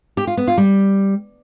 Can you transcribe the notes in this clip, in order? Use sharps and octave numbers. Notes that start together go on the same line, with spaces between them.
G4
F4
B3
F4
G3